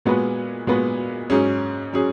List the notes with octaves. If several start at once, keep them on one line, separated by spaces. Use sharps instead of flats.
A#2 G#3 B3 F#4 B4
A#2 G#3 B3 F#4 B4
G#2 F#3 C#4 G#4
F#3 C#4 G#4